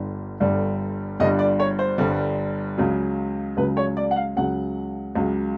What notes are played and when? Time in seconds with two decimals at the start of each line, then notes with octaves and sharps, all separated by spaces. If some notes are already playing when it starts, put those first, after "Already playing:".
Already playing: G1 G2 D3 G3
0.40 G1 G2 D3 G3
1.20 G1 G2 D3 G3 D#5
1.39 D5
1.60 C#5
1.79 C5
1.98 G1 G2 D3 G3
2.78 C#2 C#3 F#3
3.57 C#2 C#3 F#3 B4
3.77 C#5
3.97 D5
4.11 F#5
4.16 F5
4.37 C#2 C#3 F#3 F#5
5.15 C#2 C#3 F#3